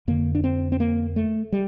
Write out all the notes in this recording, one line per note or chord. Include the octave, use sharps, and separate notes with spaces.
F2 D3 A#3
D4
C4
C4
A#3
A3
G3